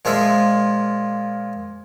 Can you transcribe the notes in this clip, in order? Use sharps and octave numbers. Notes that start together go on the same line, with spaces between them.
A#2 F3 G#3 F4 E5